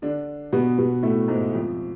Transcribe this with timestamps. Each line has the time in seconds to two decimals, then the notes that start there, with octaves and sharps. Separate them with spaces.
0.02 D3 D4
0.52 B2 B3
0.78 B2 B3
1.03 A2 A3
1.28 G#2 G#3
1.53 F2 F3